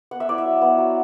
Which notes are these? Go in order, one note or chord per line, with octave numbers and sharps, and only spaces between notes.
B3 F#5
E5
E4 D5
E5
F#3
B3
F#3